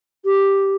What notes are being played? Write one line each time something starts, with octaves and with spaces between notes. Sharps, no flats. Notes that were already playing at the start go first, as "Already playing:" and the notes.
G4